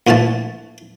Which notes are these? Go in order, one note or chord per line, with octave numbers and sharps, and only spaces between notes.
D2 A#2 E3 F3 A5